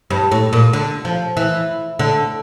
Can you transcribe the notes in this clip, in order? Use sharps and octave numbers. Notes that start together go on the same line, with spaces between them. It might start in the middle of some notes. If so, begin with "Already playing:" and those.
G2
A2
A#2
D3
F3
E3
D3